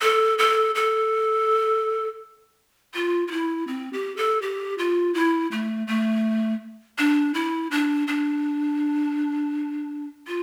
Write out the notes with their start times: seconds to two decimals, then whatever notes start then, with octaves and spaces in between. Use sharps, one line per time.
0.02 A4
0.39 A4
0.75 A4
2.94 F4
3.28 F4
3.31 E4
3.68 C4
3.93 G4
4.17 A4
4.42 G4
4.78 F4
5.14 E4
5.52 A3
5.87 A3
6.99 D4
7.34 E4
7.71 D4
8.08 D4
10.27 F4